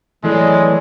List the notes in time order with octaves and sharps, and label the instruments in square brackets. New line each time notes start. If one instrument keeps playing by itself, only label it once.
[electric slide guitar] A2 A4 D5 [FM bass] E3 [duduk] F#3 [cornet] G#3